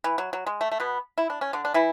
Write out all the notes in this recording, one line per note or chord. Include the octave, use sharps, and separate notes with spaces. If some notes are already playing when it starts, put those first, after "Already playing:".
E3
F#3
F#3
G#3
A3
A3
B2 B3
E4
D4
C#4
D3 D4
D4
E3 E4